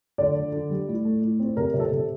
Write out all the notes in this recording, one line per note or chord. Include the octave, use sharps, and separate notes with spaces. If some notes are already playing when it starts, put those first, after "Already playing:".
D3 D5
D3
D3
G3
A2
A3
A2
C4
C3 A#4
C3
A4
C3